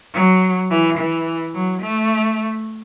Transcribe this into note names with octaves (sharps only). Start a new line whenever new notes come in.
F#3
E3
E3
F#3
A3